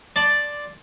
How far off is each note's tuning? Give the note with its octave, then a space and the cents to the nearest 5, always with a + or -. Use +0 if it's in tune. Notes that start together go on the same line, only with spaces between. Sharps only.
D5 +0 A5 +0 C6 +15